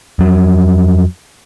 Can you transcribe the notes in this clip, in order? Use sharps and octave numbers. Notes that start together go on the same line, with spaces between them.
F2 F#3